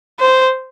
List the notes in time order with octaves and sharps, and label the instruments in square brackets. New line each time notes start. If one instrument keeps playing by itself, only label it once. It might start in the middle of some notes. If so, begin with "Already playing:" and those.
[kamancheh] C5